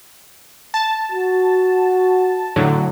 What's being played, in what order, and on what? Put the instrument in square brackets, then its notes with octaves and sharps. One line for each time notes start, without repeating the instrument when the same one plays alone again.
[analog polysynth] A5
[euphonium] F#4
[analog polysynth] A2 D3 F#3